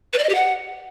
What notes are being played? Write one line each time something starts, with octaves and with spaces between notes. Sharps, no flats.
B4
D5
D#5
G4
F#5